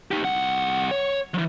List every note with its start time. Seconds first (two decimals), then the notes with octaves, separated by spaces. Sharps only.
0.11 D#4 G4
0.23 C2 F#5
0.91 C#5
1.34 E3 F3